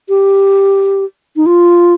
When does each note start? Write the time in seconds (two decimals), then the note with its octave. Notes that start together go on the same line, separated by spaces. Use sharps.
0.09 G4
1.36 D#4
1.46 F4